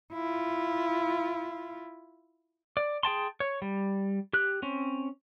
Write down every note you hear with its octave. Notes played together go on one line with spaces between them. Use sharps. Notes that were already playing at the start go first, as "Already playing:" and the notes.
E4 F4
D5
G#4 G5 A5 C6
C#5
G3
G4 F#6
C4 C#4